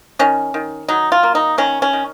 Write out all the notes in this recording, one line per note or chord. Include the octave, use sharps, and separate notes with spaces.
D#3 C#4
D#3
F#3 D#4
F4
A#3
D#4
D#3 C#4
C#4
D#3